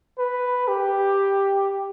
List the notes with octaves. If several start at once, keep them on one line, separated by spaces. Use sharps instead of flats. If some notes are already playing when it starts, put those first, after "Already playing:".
B4
G4